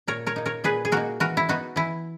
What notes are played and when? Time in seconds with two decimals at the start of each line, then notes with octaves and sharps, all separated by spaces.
0.07 A#2 A#4 C#5
0.27 A#4 C#5
0.36 A#3 D#4
0.46 A#4 C#5
0.64 A#2 G#4 B4
0.85 G#4
0.92 A#3 D#4 F#4 A#4
1.20 E3 F#4 A#4
1.37 E4
1.49 B3 D#4 F#4
1.76 E3 E4